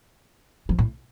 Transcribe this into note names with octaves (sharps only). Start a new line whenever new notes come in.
F3
A2